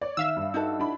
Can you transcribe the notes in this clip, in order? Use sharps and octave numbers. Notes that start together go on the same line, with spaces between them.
C#5 D5
D#3 E5 F5 E6
G2
D#4 F#4 A4
D4 E4 B5